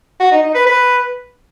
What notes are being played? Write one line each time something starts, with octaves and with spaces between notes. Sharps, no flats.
F#4
D#4
D#4
B4
B4